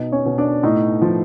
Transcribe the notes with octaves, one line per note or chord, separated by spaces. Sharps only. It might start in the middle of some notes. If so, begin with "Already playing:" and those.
Already playing: B2 D#4 D#5
C#4 C#5
B2
D4 D5
A2 D#4 D#5
F3